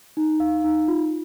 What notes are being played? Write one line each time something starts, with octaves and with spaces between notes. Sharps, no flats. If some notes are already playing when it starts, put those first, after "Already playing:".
D#4
F5
D#4
F4